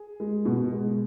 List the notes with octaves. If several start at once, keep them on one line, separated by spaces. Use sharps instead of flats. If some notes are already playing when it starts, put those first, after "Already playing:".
Already playing: G#4
G#3
B2
G#3